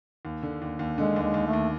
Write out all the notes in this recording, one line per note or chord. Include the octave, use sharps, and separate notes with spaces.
D#2
D3
D#2
D#2
D3 G#3
D#2
G#3
D#2
A3
D#2